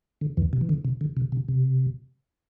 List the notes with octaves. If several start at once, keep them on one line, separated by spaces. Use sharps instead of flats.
D3
E2 E3
C3
E3
D3
C3
D3
C3
C3
C3